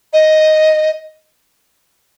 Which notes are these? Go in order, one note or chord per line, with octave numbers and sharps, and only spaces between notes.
D#5